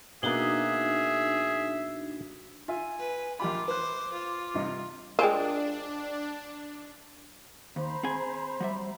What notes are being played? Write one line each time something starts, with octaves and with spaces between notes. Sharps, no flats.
B2 A#3 D4 D#4 F#4 G#4 E5
F4 E5 G#5
B4
A#1 F4 G4 B5 D6
B4 C5 F#6
F4
G2 C3 D#5
G#3 D4 F4 A#4 C5 D5 G5 G#5
D#2 C5 A#5 B5
C4 G#4 G#5
F#3 G3 E5